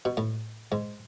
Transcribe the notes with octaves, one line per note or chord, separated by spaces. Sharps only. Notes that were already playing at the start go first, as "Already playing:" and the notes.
B2
A2
G#2